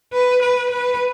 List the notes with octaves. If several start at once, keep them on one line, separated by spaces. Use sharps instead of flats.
B4
B4
B4